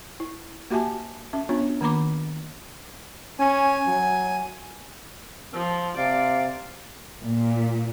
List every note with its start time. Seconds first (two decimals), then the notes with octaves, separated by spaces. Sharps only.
0.20 E4
0.70 A#3 F#4 G4 E5 G#5 A5
1.33 C#4 E5
1.49 B3 D4 F4 C#5
1.81 D#3 A#3 A#5 B5 D6
3.39 C#4 G#5
3.87 F#3
5.53 F3
5.97 C3 D5 F5
7.20 A#2